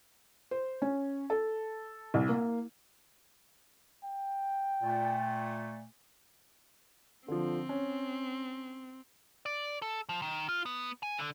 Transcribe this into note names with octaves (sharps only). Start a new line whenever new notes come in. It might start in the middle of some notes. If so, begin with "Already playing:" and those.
C5
C#4
A4
C2
A#3
G5
A#2 A3
D3 F3 C4
C#4
D5
A4
F3
D#3
F4
B3
G#5
D3